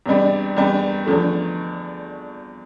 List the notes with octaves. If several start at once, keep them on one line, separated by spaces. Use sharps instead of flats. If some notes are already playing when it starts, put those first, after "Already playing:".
E2 C3 G3 D4
E2 C3 G3 D4
E2 D3 F3 A3